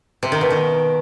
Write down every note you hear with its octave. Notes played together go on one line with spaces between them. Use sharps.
C3
D#3
B2
D#3